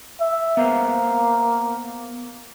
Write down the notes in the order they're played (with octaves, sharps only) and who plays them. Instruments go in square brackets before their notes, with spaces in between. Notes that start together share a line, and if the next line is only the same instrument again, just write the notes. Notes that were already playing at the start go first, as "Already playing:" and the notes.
[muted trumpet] E5
[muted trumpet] A#3 [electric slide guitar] B3 C5 F5